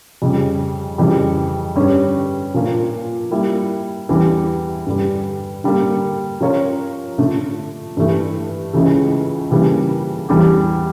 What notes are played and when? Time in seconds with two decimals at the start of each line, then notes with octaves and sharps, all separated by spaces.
0.22 F2 C#3 G3
0.98 F2 C#3 E3 G3
1.76 G2 D3 G3 C#4
2.54 A#2 F3 A#3 D4 F4
3.31 G3 A#3 E4
4.09 E2 E3 G3 D4
4.87 G2 D3 G3
5.64 D3 G3 A#3
6.41 F3 C#4 F4 A#4 C#5
7.18 D3 F3 A3 D4
7.97 G2 E3 A3
8.73 C#2 C#3 E3 A3
9.51 C#3 E3 G3 A#3 D4
10.29 E2 E3 G3 D4 G4